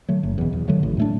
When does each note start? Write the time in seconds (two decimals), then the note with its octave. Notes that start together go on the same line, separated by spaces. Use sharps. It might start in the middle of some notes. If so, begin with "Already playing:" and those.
0.09 D3 F#3 A3
0.23 F#1
0.38 E2 B2
0.53 E2
0.68 D3 F#3 A3
0.83 A1
0.97 A2 A3 D4